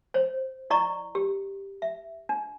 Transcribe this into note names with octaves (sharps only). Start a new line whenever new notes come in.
C5 C#5
E4 D5 D#5 A#5 C#6
G4
E5
D4